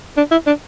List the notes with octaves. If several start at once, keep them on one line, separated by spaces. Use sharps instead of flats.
D4
E4
D4